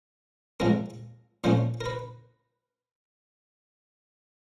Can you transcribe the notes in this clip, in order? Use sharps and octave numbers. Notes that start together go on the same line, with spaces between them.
A2 F3 G#3 C4 A#4
A#2 F3 A3 C#4 C5
A#4
B4